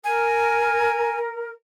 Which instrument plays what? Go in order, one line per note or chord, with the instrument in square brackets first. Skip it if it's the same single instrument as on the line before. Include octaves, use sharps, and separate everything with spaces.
[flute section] A#4 [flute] G#5